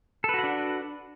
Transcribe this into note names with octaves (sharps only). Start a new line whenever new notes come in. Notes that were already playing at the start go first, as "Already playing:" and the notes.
D4 F#4 A4 B4 F#5